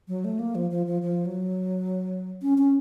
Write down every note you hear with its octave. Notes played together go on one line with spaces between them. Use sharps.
F#3
A3
A#3
F3
F3
F3
F3
F#3
C#4
C#4